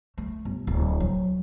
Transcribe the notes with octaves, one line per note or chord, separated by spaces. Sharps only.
A3
G1
D1
F#3